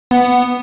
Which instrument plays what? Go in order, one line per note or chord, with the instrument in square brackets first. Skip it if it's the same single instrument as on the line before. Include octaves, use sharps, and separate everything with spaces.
[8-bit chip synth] B3